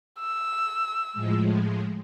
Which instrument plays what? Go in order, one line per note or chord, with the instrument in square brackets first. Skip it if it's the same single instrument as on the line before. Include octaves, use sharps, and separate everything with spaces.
[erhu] E6
[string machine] A2 F3 G#3